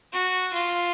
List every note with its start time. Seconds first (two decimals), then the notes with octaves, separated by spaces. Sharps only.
0.13 F#4
0.54 F4